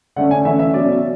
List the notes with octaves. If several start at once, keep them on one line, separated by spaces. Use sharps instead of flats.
D3 A3 C#4 F#5
G#5
E3 A3 C#4 E5
E5
B2 F#3 C#4 D5